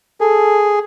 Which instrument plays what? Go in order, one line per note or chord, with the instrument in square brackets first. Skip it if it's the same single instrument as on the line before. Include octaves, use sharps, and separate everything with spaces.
[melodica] G#4 [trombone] A4